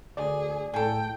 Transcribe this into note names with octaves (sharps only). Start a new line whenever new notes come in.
D2 G#4 D5
A2 G#4 A4 G5